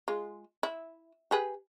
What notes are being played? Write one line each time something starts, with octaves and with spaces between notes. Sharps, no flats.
G#3 F4
E4
G4 G#4 B4